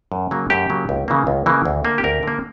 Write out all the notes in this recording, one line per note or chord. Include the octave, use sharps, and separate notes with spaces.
F#2
C#3 F#3 A#3
F#2 G4
C#3 F#3 A#3
C#2
C#3 E3 A#3
C#2
C#3 E3 A#3
D2
D3 A#3
G4
D2 A#4
D3 A#3